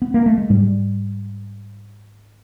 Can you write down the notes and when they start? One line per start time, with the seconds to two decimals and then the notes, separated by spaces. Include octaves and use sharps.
0.02 B3
0.14 A#3
0.26 A3
0.38 G#3
0.50 G#2 G3